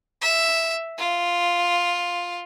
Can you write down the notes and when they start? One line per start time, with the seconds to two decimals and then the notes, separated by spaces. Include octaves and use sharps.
0.21 E5
0.98 F4